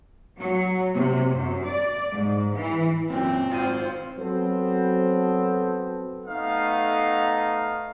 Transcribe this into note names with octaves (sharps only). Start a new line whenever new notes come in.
F#3
C3
F#2
D5
G#2
E3
F#2 A#2 C4
G#1 F4 C5 D#7
F#3 B3 C4 A4 C5
A3 B3 D#4 F5